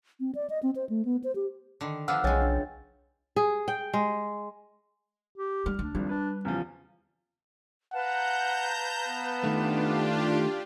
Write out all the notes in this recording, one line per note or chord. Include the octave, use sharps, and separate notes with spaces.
C4
D5
D#5
C4
C5
A3
B3
C5
G4
D3 D#3
F3 B3 D4 F#5 E6 F6
B1 C#3 G#3 C#5 G5 A6
D4
G#4
G5
G#3
G4
G3 F6
D2 D4
G#1 F2 G3
D4 B4
E2 C#3 F3 C#4
B4 F5 F#5 A5 A#5 G6
B3
D#3 A3 D4 F4 G4